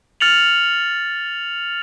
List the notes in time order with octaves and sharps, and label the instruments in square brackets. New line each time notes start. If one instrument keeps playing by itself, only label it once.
[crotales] F6 A6 C#7 F7 F#7